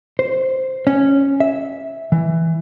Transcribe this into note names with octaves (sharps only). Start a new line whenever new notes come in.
C5
C#4
E5
E3